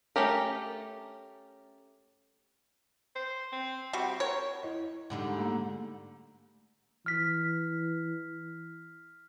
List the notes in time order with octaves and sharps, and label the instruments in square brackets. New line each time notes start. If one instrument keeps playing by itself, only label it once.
[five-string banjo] A3 C#4 G4 A#4
[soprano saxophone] C5
C4
[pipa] G3 F#4 [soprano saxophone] C4
[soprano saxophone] A#4 [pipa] C#5
[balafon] E4 D#5
[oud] G#2 D3 G3 [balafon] F#5
[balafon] A3 A#3 A#5
[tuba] E3 [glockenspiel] F6 B6